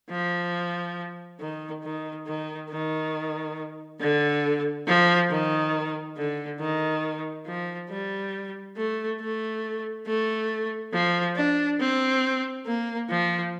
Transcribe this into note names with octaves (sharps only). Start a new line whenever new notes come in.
F3
D#3
D#3
D#3
D#3
D3
F3
D#3
D3
D#3
F3
G3
A3
A3
A3
F3
D4
C4
A#3
F3